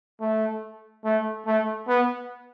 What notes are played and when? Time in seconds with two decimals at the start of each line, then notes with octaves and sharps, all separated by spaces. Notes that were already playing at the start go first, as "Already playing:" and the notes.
0.21 A3
1.05 A3
1.46 A3
1.88 B3